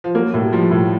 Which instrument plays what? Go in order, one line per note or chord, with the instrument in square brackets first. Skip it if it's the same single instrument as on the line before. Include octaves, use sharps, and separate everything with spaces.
[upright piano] F3
[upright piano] F#3 [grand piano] A#3
[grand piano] A2 [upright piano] G3
[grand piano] F3 [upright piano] G3
[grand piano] A2